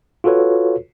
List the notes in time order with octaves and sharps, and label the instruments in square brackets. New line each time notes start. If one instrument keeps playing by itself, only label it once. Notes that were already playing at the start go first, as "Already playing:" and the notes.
[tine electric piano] F4 F#4 A4 B4 C#5